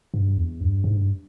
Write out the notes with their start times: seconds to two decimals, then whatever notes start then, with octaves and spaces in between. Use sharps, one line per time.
0.14 G2
0.37 E2
0.60 G2
0.84 G#2
0.97 G2